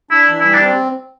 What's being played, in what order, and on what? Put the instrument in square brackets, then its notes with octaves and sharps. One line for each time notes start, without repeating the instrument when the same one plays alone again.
[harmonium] D4 [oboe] E4
[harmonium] E3
[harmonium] G3 [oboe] E4
[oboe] D4
[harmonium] C4